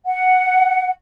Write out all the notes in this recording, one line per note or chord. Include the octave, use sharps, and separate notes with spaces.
F#5